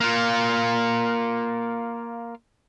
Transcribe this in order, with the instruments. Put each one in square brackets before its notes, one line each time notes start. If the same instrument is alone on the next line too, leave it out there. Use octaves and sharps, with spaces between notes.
[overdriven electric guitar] A#3 F4